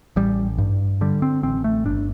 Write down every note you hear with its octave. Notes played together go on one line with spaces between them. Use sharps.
A1 G3
G2
D3 G3
C4
A1 C4
A3
G1 D4